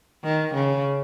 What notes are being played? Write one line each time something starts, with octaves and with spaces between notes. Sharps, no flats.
D#3
C#3